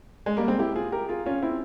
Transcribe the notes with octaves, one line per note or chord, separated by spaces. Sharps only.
G#3
G3 A#3
G#3 C4
E4 G4
F4 G#4
G4 A#4
F4 G#4
C#4 F4
C4 E4